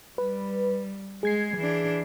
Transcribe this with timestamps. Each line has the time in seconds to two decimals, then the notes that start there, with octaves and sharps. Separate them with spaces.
0.18 G3 B4
1.23 G#3 G#4 G#6 C7
1.57 E3 D4